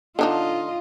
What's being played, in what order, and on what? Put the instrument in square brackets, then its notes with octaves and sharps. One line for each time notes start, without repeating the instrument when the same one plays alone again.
[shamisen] D3 D4 D#4 [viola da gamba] F4 D#5